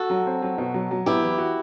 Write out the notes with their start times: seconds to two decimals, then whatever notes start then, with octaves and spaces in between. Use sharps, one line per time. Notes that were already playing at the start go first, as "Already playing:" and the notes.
Already playing: F#4 A4
0.10 F#3
0.27 C4
0.42 F#3
0.58 B2
0.74 F#3
0.91 F#3
1.06 B3 E4 G4
1.22 E3
1.38 F#4